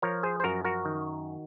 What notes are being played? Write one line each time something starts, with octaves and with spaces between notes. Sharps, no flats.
F3 A#4 C#5
G#4 C5
C5
F#2 F#4 A#4
F#4 A#4
D#3